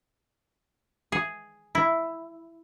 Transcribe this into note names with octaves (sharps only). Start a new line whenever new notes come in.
G#4
E4